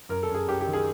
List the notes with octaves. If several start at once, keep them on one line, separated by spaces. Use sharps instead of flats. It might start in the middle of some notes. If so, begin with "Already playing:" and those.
F#2 A#4
A4
F#2
G#4
F#2 G4
G4
D#3
G#4